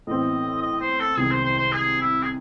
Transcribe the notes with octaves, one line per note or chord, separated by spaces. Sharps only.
A2 E3 C4 D#5
D#5
C5
A4
C2 C3 D#3 G#3 G#4
C5
C5
C5
G#4
E4
G#4